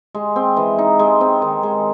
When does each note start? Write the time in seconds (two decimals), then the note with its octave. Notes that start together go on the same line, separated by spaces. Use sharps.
0.15 G#3
0.36 C4
0.57 E3
0.78 D#4
0.99 G#3
1.21 C4
1.42 D#3
1.63 G#3